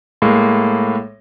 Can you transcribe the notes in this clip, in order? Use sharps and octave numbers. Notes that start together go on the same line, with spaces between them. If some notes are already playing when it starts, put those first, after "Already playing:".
A2 G#3 A#3